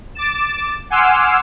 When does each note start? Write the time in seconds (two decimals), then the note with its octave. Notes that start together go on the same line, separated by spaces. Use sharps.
0.14 D6 A6 E7
0.90 F#5 G#5 C6 D6 E6 F6